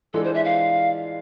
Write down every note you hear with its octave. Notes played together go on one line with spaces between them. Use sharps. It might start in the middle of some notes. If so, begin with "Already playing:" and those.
E3 G#3 D4 F4 A4
C5
E5
F5